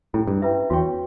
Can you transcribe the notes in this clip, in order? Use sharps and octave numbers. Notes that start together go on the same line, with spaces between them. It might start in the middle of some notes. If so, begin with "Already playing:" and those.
A2 C#4 E4 G4
G2
C#4 E4 B4 E5
E2 F#4 C#5 G5 C#6